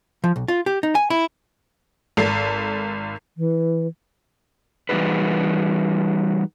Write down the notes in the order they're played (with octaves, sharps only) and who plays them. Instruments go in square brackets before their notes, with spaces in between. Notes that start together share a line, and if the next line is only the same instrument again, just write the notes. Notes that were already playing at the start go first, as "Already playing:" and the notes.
[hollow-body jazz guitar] F3
B1
F4
G4
D#4
G#5
E4
[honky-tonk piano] G#1 A4 C7
[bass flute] E3
[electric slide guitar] E3 G3 D#4 F#4 G#4 B4